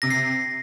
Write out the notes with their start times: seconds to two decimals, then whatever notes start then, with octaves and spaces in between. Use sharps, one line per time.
0.02 C3 A#6
0.10 C7